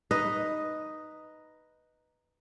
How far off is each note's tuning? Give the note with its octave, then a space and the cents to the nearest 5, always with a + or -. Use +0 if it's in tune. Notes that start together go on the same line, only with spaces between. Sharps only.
D#4 +0 B4 +0 D#5 +0